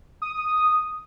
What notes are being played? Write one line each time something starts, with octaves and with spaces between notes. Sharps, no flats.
D#6